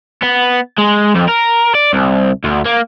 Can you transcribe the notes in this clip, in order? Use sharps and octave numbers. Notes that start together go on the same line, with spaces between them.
B3
G#3
F2
A#4
D5
C2
D2
A#3